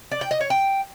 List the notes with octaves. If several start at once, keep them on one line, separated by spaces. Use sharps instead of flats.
D5
G5
D#5
C#5
G5